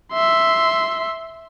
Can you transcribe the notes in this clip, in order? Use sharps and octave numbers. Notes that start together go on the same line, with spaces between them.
E5 C6